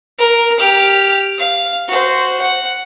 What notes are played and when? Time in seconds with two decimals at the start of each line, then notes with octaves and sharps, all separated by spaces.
0.18 A#4
0.58 G4 F6
1.38 F5
1.88 F#4 C5
2.42 F#5